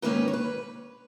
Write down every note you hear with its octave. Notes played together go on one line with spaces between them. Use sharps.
G#2 D#3 A#3 C#4 B4
C#5
B4